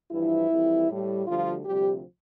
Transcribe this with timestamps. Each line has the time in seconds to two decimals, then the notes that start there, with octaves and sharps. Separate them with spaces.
0.11 G2 E3 F3 E4
0.50 F2 E3 G3
0.89 A2 G3
1.27 D2 D3 F3 G3 F4
1.65 D2 C3 F3 G3 G4